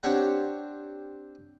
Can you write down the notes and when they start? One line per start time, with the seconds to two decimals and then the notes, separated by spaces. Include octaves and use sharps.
0.03 C4 D4 G4 C#5 F#5